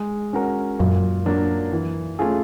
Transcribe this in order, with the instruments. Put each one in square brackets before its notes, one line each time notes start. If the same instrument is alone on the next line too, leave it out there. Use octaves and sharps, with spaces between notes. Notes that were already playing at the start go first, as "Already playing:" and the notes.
Already playing: [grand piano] G#3
C#4 F#4 A#4
[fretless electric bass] F#2 [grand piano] A#2
[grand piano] F#3 A#3 D4
E3
A3 C#4 F4 G#4